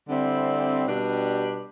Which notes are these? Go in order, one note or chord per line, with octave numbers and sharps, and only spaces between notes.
D3 G3 C4 E4
B2 G3 D4 G4 B4